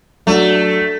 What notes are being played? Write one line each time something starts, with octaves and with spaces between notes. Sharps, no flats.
F#3 A3 D4 F#4